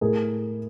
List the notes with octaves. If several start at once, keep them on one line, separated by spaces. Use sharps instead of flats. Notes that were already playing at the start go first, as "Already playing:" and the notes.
A2 G#4 A#4